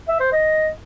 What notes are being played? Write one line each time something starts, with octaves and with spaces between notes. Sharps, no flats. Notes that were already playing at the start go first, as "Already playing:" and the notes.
E5
C5
D#5